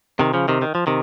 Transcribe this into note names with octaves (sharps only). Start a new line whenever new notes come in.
C3 D#3
C#3 F3
C3 D#3
D#3
F3
C3 D#3